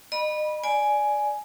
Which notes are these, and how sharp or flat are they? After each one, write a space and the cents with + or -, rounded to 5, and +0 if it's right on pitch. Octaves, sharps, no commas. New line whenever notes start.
D#5 -35 B5 -20
D5 +0 G#5 +10